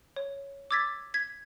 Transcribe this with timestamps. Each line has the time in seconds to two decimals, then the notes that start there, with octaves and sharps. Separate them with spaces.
0.16 C#5
0.71 D6 E6 G#6 A6 B6
1.14 G#6 B6